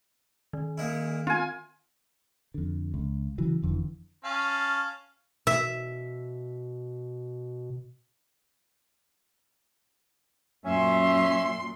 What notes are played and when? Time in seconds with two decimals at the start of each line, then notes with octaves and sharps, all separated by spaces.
0.53 D#3
0.78 A#2 G#3 E4
1.27 C4 F4 G#5
2.54 F2 D3
2.94 C#2
3.38 C#3 E3 F#3
3.62 F#1 F2 D3 E3
4.24 C#4 F5 A5
5.47 B2 E5
10.65 F#2 A#2 C#4 E5 C6